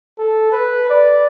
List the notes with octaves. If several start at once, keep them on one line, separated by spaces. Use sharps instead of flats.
A4
B4
D5